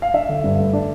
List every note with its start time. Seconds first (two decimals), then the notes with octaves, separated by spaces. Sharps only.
0.02 F5
0.14 D4 E5
0.29 D3
0.44 G2
0.59 A3
0.73 D4